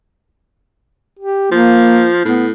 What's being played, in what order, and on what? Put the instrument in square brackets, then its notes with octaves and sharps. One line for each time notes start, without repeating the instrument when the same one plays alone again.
[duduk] G4
[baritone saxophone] F3 [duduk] A#3
[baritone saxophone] A2 [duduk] B3